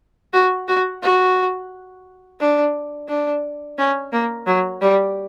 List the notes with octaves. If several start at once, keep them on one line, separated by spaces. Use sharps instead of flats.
F#4
F#4
F#4
D4
D4
C#4
A#3
F#3
G3